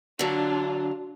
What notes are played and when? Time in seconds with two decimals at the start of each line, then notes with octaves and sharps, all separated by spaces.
0.19 D3 F#3 D4 F4